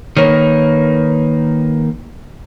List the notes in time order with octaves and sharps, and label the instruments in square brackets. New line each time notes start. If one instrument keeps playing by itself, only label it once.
[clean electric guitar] D#3 A#3 [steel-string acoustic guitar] B4 C#5